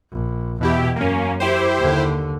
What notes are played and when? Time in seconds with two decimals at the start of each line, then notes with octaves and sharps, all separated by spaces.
0.11 A#1
0.61 E2 B2 E4 G4
0.96 F#2 A#3 C#4
1.40 E4 G4 C5
1.78 D#2 D3